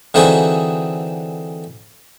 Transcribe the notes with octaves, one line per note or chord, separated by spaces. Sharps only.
D3 E3 C4 D#4 F#4 G#4